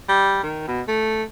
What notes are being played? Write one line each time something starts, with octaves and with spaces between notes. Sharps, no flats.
G3
D#3
B2
A3